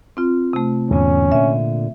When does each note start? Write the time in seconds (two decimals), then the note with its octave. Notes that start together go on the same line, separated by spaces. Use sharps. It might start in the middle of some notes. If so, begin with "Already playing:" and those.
0.17 C4 F4
0.53 C3 A3
0.91 E2 G#2 D3 C#4
1.32 A#2 D3 E5